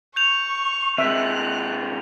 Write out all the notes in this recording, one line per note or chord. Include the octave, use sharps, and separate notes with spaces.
C#6 G6 F7
C3 G#3 E5 F#6